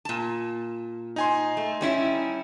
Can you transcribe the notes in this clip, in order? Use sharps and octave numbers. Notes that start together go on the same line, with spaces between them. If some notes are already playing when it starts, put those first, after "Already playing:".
A#2 A5
D#4 G#5 C6
A3
G3 C#4 E4